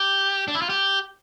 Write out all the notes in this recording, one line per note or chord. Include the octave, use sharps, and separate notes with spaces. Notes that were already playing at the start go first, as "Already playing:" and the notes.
Already playing: G4
D4
E4
F4
G4